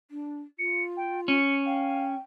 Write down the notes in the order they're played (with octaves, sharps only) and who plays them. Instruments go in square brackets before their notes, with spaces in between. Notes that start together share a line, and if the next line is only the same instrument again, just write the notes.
[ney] D4
[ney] F4 [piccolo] C#7
[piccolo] G5
[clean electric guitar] C#4 [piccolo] C#7
[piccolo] F5 [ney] G5